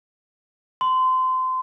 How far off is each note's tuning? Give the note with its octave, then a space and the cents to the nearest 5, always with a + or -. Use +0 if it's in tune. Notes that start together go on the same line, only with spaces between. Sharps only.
C6 -25